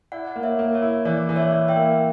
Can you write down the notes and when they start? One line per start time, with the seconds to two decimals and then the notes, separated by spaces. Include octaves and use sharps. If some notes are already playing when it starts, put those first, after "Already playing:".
0.12 E4 D5 F#5
0.36 A#3
0.43 C#5 E5
0.59 A#3
0.74 C#5 E5
0.82 E4
1.05 E3 D5
1.29 E3 D5
1.36 C#5 E5
1.52 E3
1.68 E5 G5
1.76 A#3